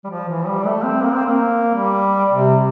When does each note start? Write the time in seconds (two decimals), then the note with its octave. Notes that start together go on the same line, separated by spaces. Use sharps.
0.04 G3
0.10 F3
0.28 E3
0.47 G3
0.65 A3
0.84 C4
1.01 A#3
1.14 C4
1.26 A#3
1.75 G3
2.31 C3